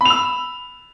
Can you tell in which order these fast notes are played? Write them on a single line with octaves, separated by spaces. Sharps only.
B5 F7 E6